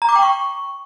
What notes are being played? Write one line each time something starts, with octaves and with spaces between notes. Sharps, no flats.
A#5
D6
G5
C#6